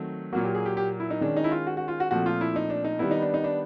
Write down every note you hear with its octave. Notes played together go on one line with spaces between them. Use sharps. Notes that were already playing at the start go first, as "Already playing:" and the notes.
Already playing: D#3 F#3 A3 C4
A#2 F#3 A#3 F#4
G4
G#4
G4
G4
E4
D#4
D#3 G#3 C#4 D4
D#4
E4
F4
F#4
F#4
F4
F#4
A#2 F3 A3 C4 F#4
F4
E4
D#4
D4
D#4
D#3 G3 B3 E4
D#4
D4
D#4
D4